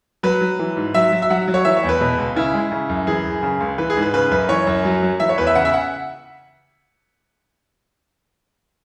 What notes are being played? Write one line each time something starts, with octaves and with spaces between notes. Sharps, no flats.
F#3 B4
F#3
E3
G#2
F#3 E5
F#3
E5
F#3 F#5
F#3
C#5
E3 E5
C#5
E2
B4
B2
C#2
C#3 E4
G#3
C#3
F#2
E3 G#4
F#2
C#3
C#2
E3 B4
G#4
G#2
B4
C#3 B4
F#2 B4
E3 C#5
F#2
F#3
F#3
E3 E5
C#5
E2 B4
E5
C#3 F#5
E5
F#5